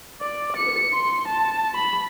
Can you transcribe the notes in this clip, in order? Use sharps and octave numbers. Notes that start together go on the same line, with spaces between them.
D5
C#7
C6
A5
B5